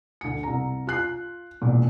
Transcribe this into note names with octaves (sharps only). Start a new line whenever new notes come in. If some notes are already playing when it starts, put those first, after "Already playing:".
D2 C#7
C2 A#5
F4 F#6 C7
E1 A#2